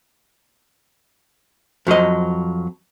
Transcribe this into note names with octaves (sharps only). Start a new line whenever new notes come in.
F2 F#3 C5 D#5